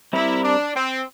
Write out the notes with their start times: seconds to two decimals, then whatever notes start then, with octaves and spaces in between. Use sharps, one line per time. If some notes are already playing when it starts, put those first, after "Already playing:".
0.13 G3 C4 E4 G4 A#4
0.44 D4
0.74 C4